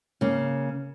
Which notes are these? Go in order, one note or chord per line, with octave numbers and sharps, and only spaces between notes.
C#3 A#3